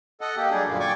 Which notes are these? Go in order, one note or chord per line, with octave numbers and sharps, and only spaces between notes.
A4 D#5 F#5
A#3 G4
F#3 G3 D4 G#4
F#2 A#2 D3 A#3
D5 G5 G#5 C#6 D6